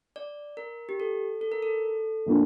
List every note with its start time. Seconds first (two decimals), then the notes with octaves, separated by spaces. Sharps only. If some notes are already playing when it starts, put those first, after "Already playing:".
0.16 D5
0.57 A#4
0.89 G4
1.00 A4
1.41 A4
1.52 A#4
1.62 A4
2.26 A2 F3 A#3 D4